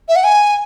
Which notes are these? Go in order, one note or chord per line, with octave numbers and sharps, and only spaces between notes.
E5
F#5
G#5